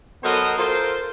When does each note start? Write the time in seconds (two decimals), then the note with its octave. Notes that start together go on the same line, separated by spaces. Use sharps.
0.24 F#3 B3 A4 A#4 C5 D#5
0.58 F4 A4 A#4 C5